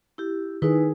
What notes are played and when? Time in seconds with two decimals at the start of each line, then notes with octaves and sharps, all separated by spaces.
0.18 E4 G4
0.62 D#3 D#4 E4 G#4 B4